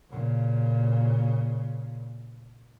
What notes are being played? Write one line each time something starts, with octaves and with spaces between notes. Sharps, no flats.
A#2 C#3